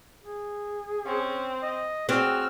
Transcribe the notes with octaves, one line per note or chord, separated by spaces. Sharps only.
G#4
C4 C#4
D#5
C4 F#4 G#4 E6 F6